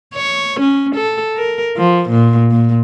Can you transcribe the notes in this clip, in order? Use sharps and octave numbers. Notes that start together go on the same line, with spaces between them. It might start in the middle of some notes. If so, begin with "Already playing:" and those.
C#5
C#4
A4
A#4
F3
A#2
A#2